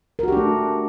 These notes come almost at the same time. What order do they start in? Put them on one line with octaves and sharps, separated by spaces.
A#4 F#4 G4 D4 A3